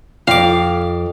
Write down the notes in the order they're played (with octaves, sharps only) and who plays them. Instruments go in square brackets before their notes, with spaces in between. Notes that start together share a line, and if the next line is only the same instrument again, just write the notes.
[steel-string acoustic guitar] F2 [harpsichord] F5 D6